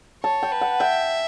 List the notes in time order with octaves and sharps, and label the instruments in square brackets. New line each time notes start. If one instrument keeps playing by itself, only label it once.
[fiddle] C#5 [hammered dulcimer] A5
[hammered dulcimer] G5
[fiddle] B4
[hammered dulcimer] F#5
[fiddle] E5 [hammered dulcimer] G5